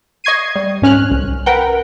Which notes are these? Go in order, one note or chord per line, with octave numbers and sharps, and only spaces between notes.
D#5 C#6 G#6 C7 D#7
G3
G#2 C#4 F6 F#6
C2
A#4 B4 F#5 G5